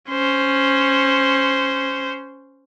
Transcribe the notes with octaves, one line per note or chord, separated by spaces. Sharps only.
C#4 C5